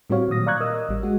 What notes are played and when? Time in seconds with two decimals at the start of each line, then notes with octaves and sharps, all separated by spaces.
0.10 A2 G3 C4 F#4 C#5 F5
0.28 A#2 D#3 F#3 D#6 A#6
0.46 D5 F5 A#5 C#6 F#6 G#6
0.60 A#4 D#5 D#6 E6
0.89 A1 G3
1.03 G#3 F#4